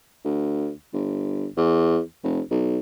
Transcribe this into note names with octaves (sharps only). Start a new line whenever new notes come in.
D2
G1
E2
F1
B1